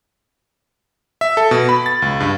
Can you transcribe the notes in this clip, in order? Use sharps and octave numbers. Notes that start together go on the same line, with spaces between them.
E5
A4
B2
B5
A6
C#2
G2